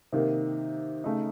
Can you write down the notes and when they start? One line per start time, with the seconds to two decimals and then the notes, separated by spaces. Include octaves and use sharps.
0.13 C3 D#3 A#3
1.04 C#3 A3 D#4